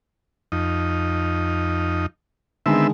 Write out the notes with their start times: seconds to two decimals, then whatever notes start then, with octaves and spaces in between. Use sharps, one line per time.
0.52 F2 D#4
2.66 D3 D#3 G#3 B3 C4 E5